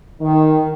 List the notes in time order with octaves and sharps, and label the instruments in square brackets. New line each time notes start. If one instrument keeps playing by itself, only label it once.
[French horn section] D#3